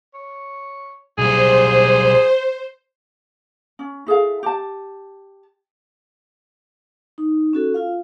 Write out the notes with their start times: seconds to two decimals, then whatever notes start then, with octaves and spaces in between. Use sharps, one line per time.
0.14 C#5
1.18 B1 G3 G#4 C5
3.79 C#4
4.07 E4 G#4 A4 F5
4.43 G4 A5
7.18 D#4
7.53 C#4 F#4 A4
7.74 F4 F5